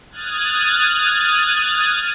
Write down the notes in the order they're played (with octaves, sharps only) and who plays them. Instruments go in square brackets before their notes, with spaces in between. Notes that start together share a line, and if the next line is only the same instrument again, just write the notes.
[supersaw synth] D#6 F6 F#6 G#6 A6